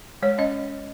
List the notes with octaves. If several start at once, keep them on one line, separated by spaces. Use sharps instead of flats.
G#3 C#5
C#4 D#5